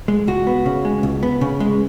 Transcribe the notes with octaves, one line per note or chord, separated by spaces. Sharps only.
G#3
C#2 F#4
B3
C#3
G#3
C#2
B3
C#3
G#3